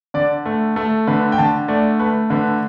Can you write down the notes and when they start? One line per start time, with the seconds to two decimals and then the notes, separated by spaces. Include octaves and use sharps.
0.14 D3 D5
0.46 A3
0.76 A3 A4
1.07 D3 B4
1.32 G5
1.38 D3 A5
1.68 A3 D5
1.99 A3 B4
2.30 D3 B4